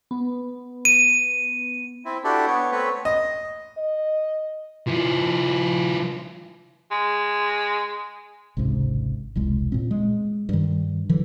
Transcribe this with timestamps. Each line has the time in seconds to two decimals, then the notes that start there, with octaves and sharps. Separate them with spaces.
0.11 B3
0.85 D#7
2.05 C4 E4
2.24 D4 E4 F#4 G4 A4 D5
2.47 B3 C#5
2.72 A3 C4 B4 C#5
3.05 D#5
3.77 D#5
4.88 F3 E4
6.91 G#3
8.57 G#1 C#2 G#2 C3
9.35 E1 C2 G#3
9.72 A#2 C4
9.91 G#3
10.49 G2 D#3
11.09 D3 E3 F#3